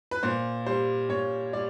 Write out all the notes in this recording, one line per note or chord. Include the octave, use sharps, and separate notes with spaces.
B4
A#2 C5
G3 C5
A#2 C#5
G3 D5